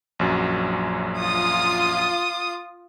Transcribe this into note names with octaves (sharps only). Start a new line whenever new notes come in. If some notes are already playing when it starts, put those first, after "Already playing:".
A#1 F#2 F#3
F4 D#6